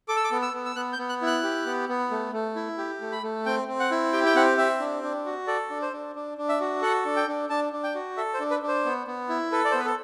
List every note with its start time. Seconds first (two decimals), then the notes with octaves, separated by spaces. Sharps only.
0.08 A4 D6
0.16 E6
0.24 D6
0.31 B3
0.42 E6
0.53 B3
0.66 E6
0.76 B3 F#6
0.93 G6
0.98 B3
1.09 F#6
1.22 E4
1.27 F#6
1.43 G4
1.66 B3
1.89 B3
2.11 A3
2.33 A3
2.56 E4
2.78 G4
3.01 A3
3.12 B5
3.23 A3
3.46 C4 G5
3.68 C4
3.80 F#5
3.91 E4
4.13 G4 G5
4.26 G5
4.35 C4 F#5
4.58 C4 E5
4.80 D4
5.03 D4
5.26 F#4
5.47 A4 D5
5.70 D4
5.82 C5
5.93 D4
6.15 D4
6.38 D4
6.49 E5
6.60 F#4
6.82 A4 F#5
7.05 D4
7.16 G5
7.27 D4
7.49 D4 A5
7.73 D4
7.83 G5
7.95 F#4
8.17 A4 E5
8.34 C5
8.40 D4
8.50 B4
8.62 D4
8.68 C5
8.85 B3
9.07 B3
9.29 E4
9.52 A4 B4
9.65 D5
9.71 C5
9.74 B3 B4
9.85 A4